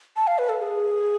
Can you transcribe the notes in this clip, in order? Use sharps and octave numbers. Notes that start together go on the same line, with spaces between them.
A5
F5
B4
A4
G#4